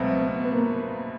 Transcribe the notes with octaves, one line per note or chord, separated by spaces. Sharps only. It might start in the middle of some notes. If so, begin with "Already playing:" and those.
Already playing: C#2 B2 F#3 A3 C4
B3
B3
A#3